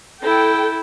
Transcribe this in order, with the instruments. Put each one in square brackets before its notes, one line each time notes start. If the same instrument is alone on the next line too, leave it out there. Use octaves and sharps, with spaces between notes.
[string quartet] E4 [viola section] A4 G5